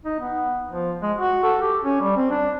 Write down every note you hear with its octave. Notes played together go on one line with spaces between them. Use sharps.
D#4
B3
F3
G#3
F#4
A4
G4
C#4
G3
C4
D4